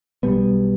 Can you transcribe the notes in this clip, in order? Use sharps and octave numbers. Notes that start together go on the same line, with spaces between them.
B1 B2 G3 B3